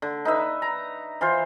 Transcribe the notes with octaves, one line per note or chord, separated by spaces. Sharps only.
D3
D#4 B4 E5
A#5
E3 F4 C5